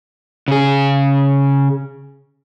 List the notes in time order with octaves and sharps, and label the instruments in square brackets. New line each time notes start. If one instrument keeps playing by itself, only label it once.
[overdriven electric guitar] C#3 G#4